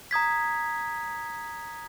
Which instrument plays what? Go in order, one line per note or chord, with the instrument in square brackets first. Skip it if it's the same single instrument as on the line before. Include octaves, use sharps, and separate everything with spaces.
[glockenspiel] A#5 D#6 G#6 B6